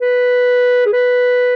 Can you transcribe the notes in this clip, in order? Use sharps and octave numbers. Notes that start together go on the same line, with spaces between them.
B4
G#4
B4